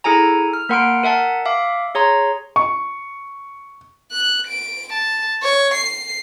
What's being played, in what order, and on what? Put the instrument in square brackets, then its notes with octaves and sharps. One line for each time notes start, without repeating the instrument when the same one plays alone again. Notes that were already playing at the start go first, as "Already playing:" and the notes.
[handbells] E4 G#4 A4 G#5 A#5
F6
A#3 A#4 F#5 C6 F6 D7
A#4 E5 F#5 A5
E5 F5 D6
G#4 C#5 A#5 C6
[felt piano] C#6
[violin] F#6
D7
A5
C#5
C7